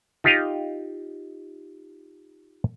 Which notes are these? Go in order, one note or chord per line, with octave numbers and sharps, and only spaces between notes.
D#4 F4 G4 D#5 F5